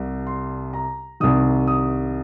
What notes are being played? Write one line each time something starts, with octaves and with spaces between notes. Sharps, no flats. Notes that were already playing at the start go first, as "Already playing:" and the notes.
Already playing: C2 C3 G3
C6
A#5
C2 C3 D#3 D#6
D#6